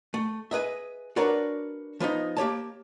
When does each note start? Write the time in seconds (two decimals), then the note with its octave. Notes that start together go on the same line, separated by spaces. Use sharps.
0.14 A3
0.51 G#4 B4 D#5 E5
1.16 D4 F#4 A#4 B4 C#5 D5
2.00 F3 B3 D4 D#4
2.37 A#3 G4 C#5 A5